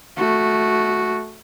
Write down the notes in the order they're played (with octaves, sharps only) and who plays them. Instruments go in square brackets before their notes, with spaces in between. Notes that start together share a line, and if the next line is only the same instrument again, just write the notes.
[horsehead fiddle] A3 F#4